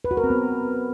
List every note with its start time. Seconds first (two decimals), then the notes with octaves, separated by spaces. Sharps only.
0.04 B4
0.11 F#4
0.17 A#4
0.24 C4
0.30 B3